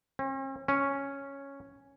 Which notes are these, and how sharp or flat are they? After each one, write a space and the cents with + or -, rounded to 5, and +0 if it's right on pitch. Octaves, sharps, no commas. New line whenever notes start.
C#4 -45
C#4 +0